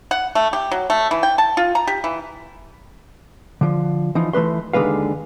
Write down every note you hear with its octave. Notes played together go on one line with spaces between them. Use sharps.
F#5
A3
G4
F#3
A3
E3
G5
A5
F4
A#5
G4
E3
D3 F3
E3 F3 D#4
E3 A3 A#3 B4 C6
D#2 D3 G#3 B4 F5